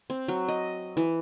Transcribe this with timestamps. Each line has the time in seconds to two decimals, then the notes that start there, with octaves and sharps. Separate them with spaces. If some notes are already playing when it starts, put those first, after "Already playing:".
0.10 C4
0.28 F#3
0.48 D#5
0.97 E3